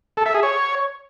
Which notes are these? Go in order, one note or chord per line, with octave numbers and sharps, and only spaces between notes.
A4
E5
G#4
C#5